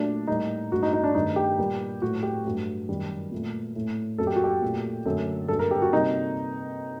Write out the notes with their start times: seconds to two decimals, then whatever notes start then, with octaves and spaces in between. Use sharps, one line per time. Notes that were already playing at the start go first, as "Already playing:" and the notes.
Already playing: A#2 F#3 A3 D4
0.27 A2 G3 A#3 D#4
0.72 G2 F#3 A3 F#4
0.83 D#4
0.93 D#4
1.04 D4
1.15 G2 D#3 A3 D#4
1.36 G4
1.59 A#2 G3 A#3
2.02 A2 F#3 A3 F#4
2.23 G4
2.45 G2 F#3 A3
2.89 F#2 D#3 G3
3.31 A#2 A3
3.75 A2 A3
4.18 F#2 F#3 A#3 A4
4.27 G4
4.36 F#4
4.44 G4
4.62 A#2 A3
5.06 F#2 D3 A3 A4
5.48 G2 F#3 A#3 A4
5.59 A#4
5.71 G4
5.82 F#4
5.92 C3 G3 A#3 D#4